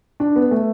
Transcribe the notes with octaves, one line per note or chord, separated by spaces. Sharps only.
D4
B3
A3